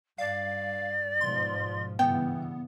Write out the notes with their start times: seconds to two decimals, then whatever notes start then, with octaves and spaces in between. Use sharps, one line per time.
0.18 G2 D5 F5
1.21 G#2 B2 F3 C6
1.99 G2 C#3 E3 B3 G5